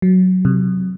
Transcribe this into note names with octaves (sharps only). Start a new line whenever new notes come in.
F#3
C3